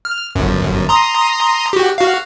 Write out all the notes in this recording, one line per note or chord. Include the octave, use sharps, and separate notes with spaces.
F6
G1 F#2
A#5 C6 D#6
F#4 G4
F#4 F5